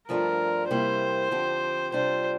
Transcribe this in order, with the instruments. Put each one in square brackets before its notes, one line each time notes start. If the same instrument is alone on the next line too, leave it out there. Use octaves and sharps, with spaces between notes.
[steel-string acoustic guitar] G2 F3 A3 D4 F4 [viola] A#4
[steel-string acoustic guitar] C3 G3 A#3 E4 [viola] C5
[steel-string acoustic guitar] D3 F3 C4 G4
[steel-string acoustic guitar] C3 G3 D4 F4 [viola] C5